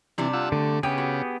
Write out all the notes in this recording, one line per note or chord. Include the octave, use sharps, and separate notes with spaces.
C3 E3 G3 D4
F4 F#5 E6
D3 A3
C#3 B3 G4 G#4 G5
F#4